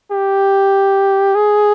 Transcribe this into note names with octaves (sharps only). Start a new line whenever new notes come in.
G4
G#4